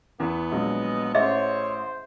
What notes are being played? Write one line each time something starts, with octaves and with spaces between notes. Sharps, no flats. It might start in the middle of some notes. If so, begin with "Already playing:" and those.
E2 B3 B4
A#1 F#3 G#3 D#5
A1 G#4 C5 C#5 D#5 E5